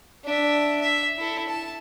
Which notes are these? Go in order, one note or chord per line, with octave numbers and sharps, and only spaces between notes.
D4 E5
E5
E4 A4
A5